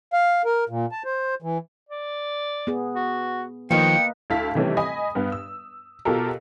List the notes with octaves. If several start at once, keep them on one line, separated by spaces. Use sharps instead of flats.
F5
A#4
A#2
A5
C5
E3
D5
B3 G#4
F#4
D#3 F3 A#3 B4 D#5 G5 C#7
D2 E4 F5 A5 B6
C3 D#3 E3 G3 A3 C#4
D#5 G#5 B5 D#6
G2 B3
E6
B2 F4 G4 A4 A#4